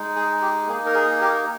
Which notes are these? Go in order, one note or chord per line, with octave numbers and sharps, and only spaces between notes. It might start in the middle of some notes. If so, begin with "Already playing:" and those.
Already playing: G#3 D#4
G#4
G4
A#3 G#4
D#4
A#4
G#4
G4 A#4